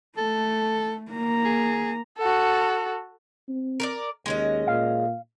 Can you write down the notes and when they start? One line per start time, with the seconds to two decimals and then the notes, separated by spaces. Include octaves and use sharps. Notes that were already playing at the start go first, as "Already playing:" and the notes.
0.17 A3 A4
1.11 A#3 A#5
1.45 G#4
2.18 F#4 A4
3.48 C4
3.80 A#4 B4 D5
4.26 D#2 G#3 C#4 D#5
4.67 A#2 F5